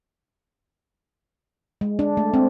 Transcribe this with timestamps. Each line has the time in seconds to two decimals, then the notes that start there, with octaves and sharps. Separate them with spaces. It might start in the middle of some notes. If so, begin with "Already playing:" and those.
1.81 G#3
1.99 D4
2.17 A3
2.34 C4